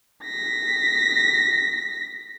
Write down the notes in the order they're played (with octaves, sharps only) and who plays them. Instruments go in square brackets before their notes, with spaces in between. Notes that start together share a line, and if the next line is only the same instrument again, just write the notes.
[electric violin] A#6 B6